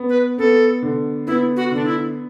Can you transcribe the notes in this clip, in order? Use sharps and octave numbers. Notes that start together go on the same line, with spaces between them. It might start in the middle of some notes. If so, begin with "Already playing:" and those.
Already playing: B3
B4
B3 A4
D3
B3 E4
F#4
D3 D4
E4